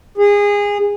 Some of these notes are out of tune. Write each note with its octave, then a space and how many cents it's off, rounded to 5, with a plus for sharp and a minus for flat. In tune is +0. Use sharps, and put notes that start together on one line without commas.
G#4 -25